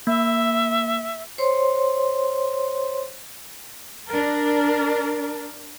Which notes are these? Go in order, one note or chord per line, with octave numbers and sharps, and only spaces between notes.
A#3 E5
C5 C#5 C6
D4 A#4